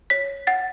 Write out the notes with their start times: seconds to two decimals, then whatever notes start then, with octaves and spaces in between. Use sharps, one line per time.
0.10 C#5 B6
0.47 F#5 A6